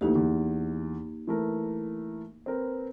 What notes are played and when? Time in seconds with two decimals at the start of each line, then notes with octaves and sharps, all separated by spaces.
0.01 D2 E3 A#3 D#4 G4
0.15 E2
1.27 E3 A3 A#4
2.46 C4 A#4 B4